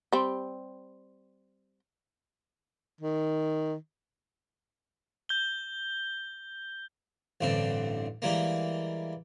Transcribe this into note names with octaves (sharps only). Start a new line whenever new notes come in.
G3 C4
D#3
G6 G7
A1 G2 D3 C4
E3 G3 G#3 A#3